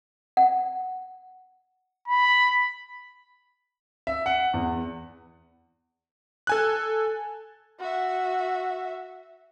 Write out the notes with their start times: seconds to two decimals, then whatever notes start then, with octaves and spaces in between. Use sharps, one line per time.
0.37 F#5
2.08 B5
4.07 E5
4.26 F#5
4.54 E2
6.47 A4 G#5 F#6
7.79 F#4 E5